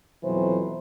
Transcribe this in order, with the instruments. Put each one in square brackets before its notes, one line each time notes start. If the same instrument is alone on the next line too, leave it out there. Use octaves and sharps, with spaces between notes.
[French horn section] F2 B2 E3 F#3 C5